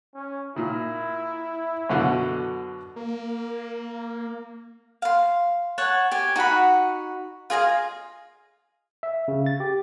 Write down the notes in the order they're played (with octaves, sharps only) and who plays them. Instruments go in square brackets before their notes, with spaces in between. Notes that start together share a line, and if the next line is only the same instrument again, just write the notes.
[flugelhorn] C#4
[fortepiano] A#2 D#3 [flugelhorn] E4
[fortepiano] F#2 B2 D3
[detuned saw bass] A#3
[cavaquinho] F5 C6
C#5 F#5 A5
G4 G#5
D#4 F#4 F#5 B5
F4 G#4 D#5 F5
[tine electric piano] E5
C#3
A6
G4